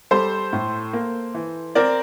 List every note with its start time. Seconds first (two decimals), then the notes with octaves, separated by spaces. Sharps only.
0.11 G3 A4 C5
0.53 A2
0.93 A#3
1.34 E3
1.75 C4 A#4 D5